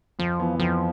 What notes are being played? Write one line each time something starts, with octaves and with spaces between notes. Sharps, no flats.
F2 F3
E3 B3
F2 F3